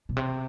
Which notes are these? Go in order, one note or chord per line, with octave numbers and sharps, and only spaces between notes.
B2
C3